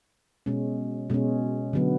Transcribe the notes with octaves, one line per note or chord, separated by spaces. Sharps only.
B2 G#3 C#4
B2 G#3 C#4
D3 F#3 B3